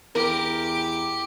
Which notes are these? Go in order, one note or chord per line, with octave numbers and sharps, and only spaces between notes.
E2 G4 A#4